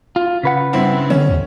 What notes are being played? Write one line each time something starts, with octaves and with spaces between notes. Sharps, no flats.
F4
C#3 B4 F#5
G2 C4 E4
D3 C#4
D#2